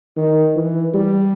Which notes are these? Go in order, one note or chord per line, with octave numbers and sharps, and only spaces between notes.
D#3
E3
G3